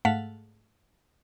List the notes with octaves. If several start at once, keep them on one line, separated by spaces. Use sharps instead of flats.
G#2 A3 F5 F#5 A5 B6